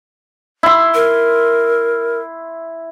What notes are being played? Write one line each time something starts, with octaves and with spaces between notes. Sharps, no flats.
E4 C6
A#4